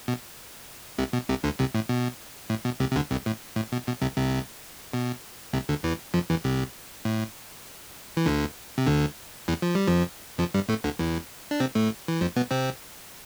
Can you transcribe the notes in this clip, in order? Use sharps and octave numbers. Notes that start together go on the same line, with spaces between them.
B2
C2 C3
B2
C2 C3
D2 D3
C2 C3
A2
B2
A2
B2
C2 C3
C3
D2 D3
C2 C3
A2
A2
B2
B2
C2 C3
C2 C3
B2
C2 C3
D2 D3
E2 E3
F2 F3
E2 E3
C2 C3
A2
E3
D2 D3
C3
D2 D3
E2 E3
F3
G3
F2 F3
F2 F3
G2 G3
A2 A3
D2 D3
E2 E3
D4
C3 C4
A2 A3
E3
F2 F3
B2 B3
C3 C4